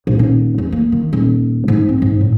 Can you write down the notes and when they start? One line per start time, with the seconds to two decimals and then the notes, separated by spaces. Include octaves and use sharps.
0.07 A#1
0.19 D#1
0.58 E2
0.72 A#3
0.92 D#3
1.13 D#1
1.68 G#2
1.89 C4
2.02 G#2
2.21 A2